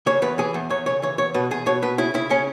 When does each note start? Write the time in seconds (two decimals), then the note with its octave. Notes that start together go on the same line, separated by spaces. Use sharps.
0.06 C#3 C#5
0.22 E2 B4
0.38 E3 G#4
0.54 E2
0.70 E2 C#5
0.86 C#3 C#5
1.02 E3 C#5
1.18 E2 C#5
1.34 B2 B4
1.51 E2 G#4
1.66 B2 C#5
1.82 B2 B4
1.98 C#3 E4
2.14 C#3 E4
2.30 C#3 C#4